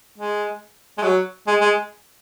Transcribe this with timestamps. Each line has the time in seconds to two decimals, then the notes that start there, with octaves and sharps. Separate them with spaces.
0.18 G#3
0.98 G#3
1.03 F#3
1.47 G#3
1.61 G#3